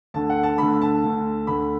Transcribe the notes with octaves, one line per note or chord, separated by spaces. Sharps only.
D2 D3 A5
F#5
A5
D2 D3 B5
A5
D2 D3
D2 D3 B5